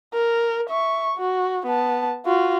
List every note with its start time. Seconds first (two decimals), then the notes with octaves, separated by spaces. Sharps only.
0.14 A#4
0.69 E5 C#6
1.17 F#4
1.66 B3 A5
2.25 F4 F#4